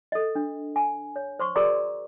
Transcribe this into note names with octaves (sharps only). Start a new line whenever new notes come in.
A4 D#5
D4
G#5
C#5
C5 C6 C#6
F#4 G#4 A#4 D5 A#5